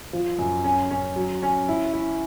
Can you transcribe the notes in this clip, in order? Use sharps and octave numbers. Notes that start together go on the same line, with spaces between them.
F3
F#2
C#4
C#4
F#3
C#4
E4
E4